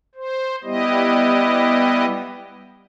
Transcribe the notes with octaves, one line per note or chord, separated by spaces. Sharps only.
C5
G3 B3 E4 G4 D#5